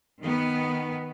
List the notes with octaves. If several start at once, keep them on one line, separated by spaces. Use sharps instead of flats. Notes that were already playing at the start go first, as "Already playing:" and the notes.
D#3 B3